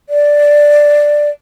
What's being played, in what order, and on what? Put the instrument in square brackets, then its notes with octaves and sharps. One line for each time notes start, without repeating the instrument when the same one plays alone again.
[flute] D5